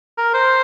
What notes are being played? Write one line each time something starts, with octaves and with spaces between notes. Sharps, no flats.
A#4
C5